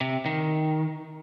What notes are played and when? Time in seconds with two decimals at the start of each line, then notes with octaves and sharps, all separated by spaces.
0.01 C3
0.26 D#3